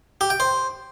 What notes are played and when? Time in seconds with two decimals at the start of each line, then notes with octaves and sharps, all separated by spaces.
0.21 G4
0.30 G5
0.40 C5